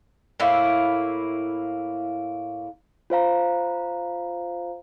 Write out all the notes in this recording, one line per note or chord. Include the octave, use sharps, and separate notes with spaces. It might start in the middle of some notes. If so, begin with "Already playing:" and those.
A2 A#3 E4
F4 C5 F5 A#5